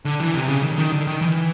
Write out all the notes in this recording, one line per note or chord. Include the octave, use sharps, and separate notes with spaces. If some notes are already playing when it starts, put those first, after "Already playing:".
D3
E3
C3
C#3
D#3
D3
D#3
D3
D#3
E3